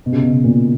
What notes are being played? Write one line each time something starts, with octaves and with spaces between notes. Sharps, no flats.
B2
C#3
B2
B2
A#2